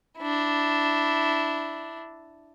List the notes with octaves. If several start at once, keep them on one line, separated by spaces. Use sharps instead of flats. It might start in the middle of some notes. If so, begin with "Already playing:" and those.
D4 E4